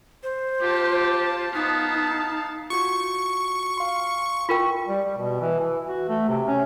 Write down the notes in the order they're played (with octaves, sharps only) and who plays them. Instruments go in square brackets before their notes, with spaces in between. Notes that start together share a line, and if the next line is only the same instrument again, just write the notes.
[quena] C5
[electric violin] F4 A5 [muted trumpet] G4
[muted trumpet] B3 [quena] D#4 [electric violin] F5 A5
[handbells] F4 F#4 [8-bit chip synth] C#6
[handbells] F5 C6
[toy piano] F4 A#4 G5 [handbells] C#6
[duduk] G3
G3
B2
E3
E3
F#4
A3
C3
C#4